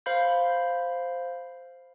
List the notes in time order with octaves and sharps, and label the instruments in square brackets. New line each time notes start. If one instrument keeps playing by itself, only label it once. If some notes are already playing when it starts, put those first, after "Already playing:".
[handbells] C5 F5 B5 G6